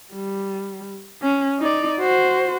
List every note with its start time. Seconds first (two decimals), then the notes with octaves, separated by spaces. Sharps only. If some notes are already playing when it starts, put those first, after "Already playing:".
0.13 G3
1.22 C#4
1.59 D#4 D5
2.00 F#4 C5